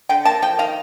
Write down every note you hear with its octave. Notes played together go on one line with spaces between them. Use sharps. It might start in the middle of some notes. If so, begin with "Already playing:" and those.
D3 G5
A#3 A5
F3 G5
D#3 F5